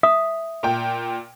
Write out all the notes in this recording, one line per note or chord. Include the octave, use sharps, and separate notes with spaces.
E5 D#6
A#2 G5